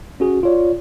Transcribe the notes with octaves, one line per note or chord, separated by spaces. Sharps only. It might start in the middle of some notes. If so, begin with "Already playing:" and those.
C#4 F#4 G#4
F4 C#5 D5